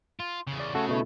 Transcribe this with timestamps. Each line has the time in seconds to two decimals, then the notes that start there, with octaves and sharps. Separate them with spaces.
0.20 F4
0.47 E2 C#3
0.60 D5
0.75 C#3 A3 F#4 A4
0.89 B2 A3 E4